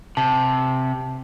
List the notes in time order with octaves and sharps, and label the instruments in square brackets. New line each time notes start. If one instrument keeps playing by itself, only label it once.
[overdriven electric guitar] C3 [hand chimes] A5